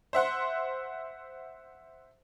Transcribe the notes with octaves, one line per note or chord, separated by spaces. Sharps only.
C5 E5 F#5 C6